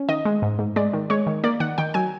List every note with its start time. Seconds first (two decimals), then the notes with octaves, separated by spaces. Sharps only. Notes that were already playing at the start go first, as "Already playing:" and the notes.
Already playing: C#4
0.09 D#3 D#5
0.25 G#3
0.42 G#2
0.59 G#2
0.76 G#3 D5
0.93 D#3
1.10 G#3 C#5
1.27 D#3
1.44 A#3 D5
1.60 D#3 F#5
1.78 D#3 G5
1.94 F#3 G#5